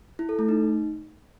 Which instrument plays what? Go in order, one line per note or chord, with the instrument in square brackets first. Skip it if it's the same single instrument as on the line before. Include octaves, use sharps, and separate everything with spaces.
[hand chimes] E4
A4
A3
D#4